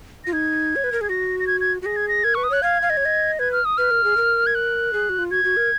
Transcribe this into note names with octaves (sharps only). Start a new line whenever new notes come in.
F4 A#6
D#4 G#6
C#5
B4
A#4
G#4 G#6
F#4 A#6
A#6
G#6
G#6
F#4
G#4 A#6
G#6
A#6
A#4 G#6
B4 C#6
D#6
C#5 F#6
F5 G#6
F5
D#5
C#5
D#5
B4 G#6
F6
D#6
B4 F6
A#4
G#4
A#4
G#6
F#6
G#4
F#4
F4
F#4 G#6
F#4
A#4